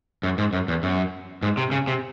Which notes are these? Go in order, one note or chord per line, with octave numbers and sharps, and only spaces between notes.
F#2
G#2
F#2
E2
F#2
G#2
C3
C#3
C3